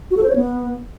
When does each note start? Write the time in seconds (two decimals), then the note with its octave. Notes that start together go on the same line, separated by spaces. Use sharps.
0.11 F#4
0.17 A4
0.23 C5
0.29 C#5
0.36 B3